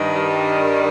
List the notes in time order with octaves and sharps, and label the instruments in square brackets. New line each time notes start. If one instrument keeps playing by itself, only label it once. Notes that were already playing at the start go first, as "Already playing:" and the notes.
Already playing: [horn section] G2 D#3
G3